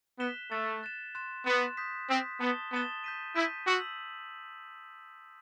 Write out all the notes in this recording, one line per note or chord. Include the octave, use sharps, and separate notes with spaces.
B3 F#6 B6 E7 G7
A3 F#6 A6 E7
F#6 A6 E7
C6 F#6 A6 E7
B3 C6 F#6 A6 E7
D#6 G6 B6
C4 D#6 G6 B6
B3 A5 D#6 A6 E7 G7
B3 A5 D#6 A6 E7 G7
G6 B6 D#7
E4 G6 B6 D#7
F#4 E6 B6 F#7